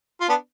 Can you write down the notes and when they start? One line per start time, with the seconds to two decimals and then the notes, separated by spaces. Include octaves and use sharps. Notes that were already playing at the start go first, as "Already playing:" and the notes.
0.21 F4
0.29 B3 D4